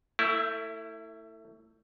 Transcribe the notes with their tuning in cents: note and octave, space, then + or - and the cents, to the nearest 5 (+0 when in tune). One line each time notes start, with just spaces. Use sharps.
A3 +30 E4 +0